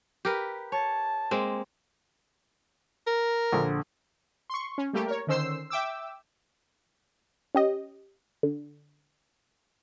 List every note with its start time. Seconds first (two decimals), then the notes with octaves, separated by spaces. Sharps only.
0.25 G4 A#4 B4
0.72 C#5 A5
1.31 G#3 A#3 C4
3.07 A#4
3.52 A#1 D3
4.50 C6 C#6
4.78 C#4
4.93 G3 A3 A#3 G4
5.07 A#4 C#5
5.27 D3 D#3 C#4 C5 E6 C7
5.70 E5 G5 D6 E6
7.55 C#4 G4 D#5
8.43 D3